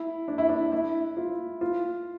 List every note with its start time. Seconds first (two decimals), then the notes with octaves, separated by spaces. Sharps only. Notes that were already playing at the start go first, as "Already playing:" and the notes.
Already playing: E4
0.28 D4
0.38 E4
0.49 D4
0.72 E4
1.17 F4
1.61 F4